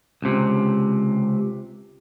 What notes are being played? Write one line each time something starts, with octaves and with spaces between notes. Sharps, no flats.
C#2 C3